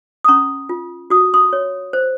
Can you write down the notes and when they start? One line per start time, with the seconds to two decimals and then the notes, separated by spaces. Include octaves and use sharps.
0.24 D#6
0.28 C#4 A#5 C#6
0.69 F4
1.10 F#4 D#6
1.34 C6 D#6
1.53 C#5
1.93 C5